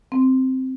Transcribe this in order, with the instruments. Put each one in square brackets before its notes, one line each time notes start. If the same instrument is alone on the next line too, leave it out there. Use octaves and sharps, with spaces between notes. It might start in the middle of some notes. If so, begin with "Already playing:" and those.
[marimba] C4